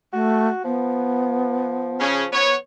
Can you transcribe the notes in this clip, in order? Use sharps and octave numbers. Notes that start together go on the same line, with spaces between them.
A3 F#4
F3 B3
C#3 C#4
B3 C#5